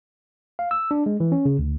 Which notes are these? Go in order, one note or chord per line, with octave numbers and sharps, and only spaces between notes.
F5
E6
D4
G#3
E3
C#4
C#3
D2